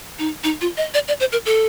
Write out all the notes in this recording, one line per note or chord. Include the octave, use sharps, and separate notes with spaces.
D#4
D#4
F4
D#5
D5
D5
C5
A#4
A4